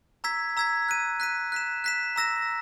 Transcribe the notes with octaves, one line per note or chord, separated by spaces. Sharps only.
A#5 E6 G#6 B6
A#5 E6 G#6 B6
F#6 B6 D#7
F#6 B6 D#7
F#6 B6 E7
F#6 B6 E7
A#5 E6 A#6 E7